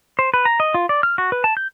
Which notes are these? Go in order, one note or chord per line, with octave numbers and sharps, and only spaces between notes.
C5
B4
A#5
D#5
F4
D5
F6
F#4
B4
A5
G6